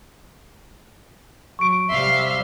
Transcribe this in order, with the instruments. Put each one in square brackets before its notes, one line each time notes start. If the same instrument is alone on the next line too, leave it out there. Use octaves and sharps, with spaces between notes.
[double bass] F#3 [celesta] C#6 D7
[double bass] C3 G3 [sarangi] E5 [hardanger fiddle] F5 C6